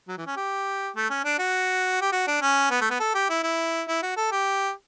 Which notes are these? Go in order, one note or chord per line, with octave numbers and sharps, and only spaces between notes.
F#3
E3
C#4
G4
A3
C#4
D4
F#4
G4
F#4
D4
C#4
B3
A3
B3
A4
G4
E4
E4
E4
F#4
A4
G4